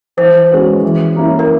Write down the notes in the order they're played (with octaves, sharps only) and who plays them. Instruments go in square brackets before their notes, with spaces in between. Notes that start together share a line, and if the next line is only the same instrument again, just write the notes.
[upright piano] E3 [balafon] C5
[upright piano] G#3 C#4 F#4 B4
E3
G3 A#3 C#4 E4
[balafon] A#4